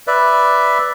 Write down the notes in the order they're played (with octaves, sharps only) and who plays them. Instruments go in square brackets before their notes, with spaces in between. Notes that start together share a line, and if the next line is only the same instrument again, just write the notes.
[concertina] B4 D5 E5